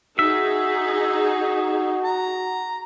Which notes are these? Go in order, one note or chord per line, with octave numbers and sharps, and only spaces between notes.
D#4 F#4 G#4 E5
A#5